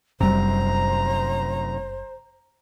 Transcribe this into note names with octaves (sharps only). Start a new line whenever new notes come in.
F#1 F#2 C3 G3 C5 A#5